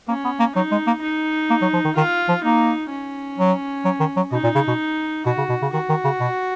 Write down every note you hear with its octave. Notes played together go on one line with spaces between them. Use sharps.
A#3 C#4
B3
A#3
F#3 D#4
G#3
A#3
D#4
A#3
F#3
F3
D#3
D#3 F4
F3
A#3 D#4
C#4
F#3
F#3
D#3
F#3
B2 D#4
A#2
C#3
B2
B2 F#4
C#3
B2
C#3
D#3 F#4
D#3
C#3
B2